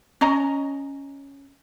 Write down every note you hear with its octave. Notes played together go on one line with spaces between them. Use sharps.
C#4 C#5 D#5 A#5